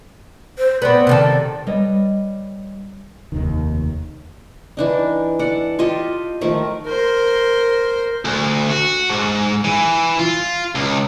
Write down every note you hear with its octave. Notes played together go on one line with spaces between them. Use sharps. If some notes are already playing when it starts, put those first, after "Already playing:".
C5
B3 C4 D5
C3 D#3 A4
G3 B4 C#5 D#5
F1 D#2 D#3
E3 D4 D#4
A4 D5 F#5
F4 G4 A4 D#5
D#3 F3 A3 A#4
A#4 C5
D2
F#4
G#2
E3
F4
C#2